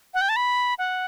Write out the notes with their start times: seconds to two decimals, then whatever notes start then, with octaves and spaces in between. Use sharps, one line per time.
0.14 F#5
0.21 G5
0.29 A5
0.36 B5
0.79 F#5